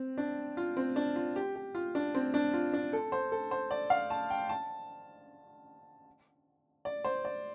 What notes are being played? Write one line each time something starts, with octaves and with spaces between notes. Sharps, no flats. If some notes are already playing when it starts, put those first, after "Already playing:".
Already playing: C4
D4
F4
C4
D4
F4
G4
G4
F4
D4
C4
D4
F4
D4
A4
C5
A4
C5
D5
F5
A5
G5
A5
D5
C5
D5